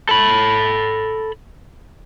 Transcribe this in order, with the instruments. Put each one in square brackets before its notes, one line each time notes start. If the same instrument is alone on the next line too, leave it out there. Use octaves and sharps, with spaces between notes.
[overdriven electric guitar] A4 B5